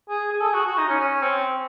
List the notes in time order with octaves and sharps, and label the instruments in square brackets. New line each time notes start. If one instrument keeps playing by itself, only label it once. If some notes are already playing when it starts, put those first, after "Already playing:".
[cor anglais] G#4
G#4
A4
G#4
F#4
F#4
D#4
C#4
C#4
C4